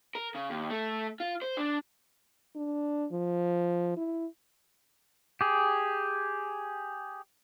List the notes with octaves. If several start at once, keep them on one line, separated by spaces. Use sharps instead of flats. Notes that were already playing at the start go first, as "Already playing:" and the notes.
A#4
C#3
D#2
A3
F4
C5
D4
D4
F3
E4
G4 G#4